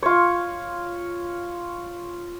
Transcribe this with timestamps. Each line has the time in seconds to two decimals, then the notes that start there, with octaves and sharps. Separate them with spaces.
0.03 F4 C#5